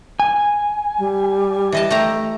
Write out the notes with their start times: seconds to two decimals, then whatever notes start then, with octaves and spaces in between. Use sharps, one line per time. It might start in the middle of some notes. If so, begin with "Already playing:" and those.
0.20 G#5
0.99 G3
1.72 E3 D#5 A5
1.90 A3 G4 A#5